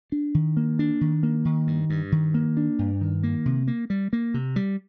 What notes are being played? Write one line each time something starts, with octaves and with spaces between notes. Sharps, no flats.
D4
D#3
A#3
D4
D#3
A#3
D#3
G2
G2
D#3
A#3
D4
G2
D#3
A#3
C3
A#3
G3
A#3
C3
G3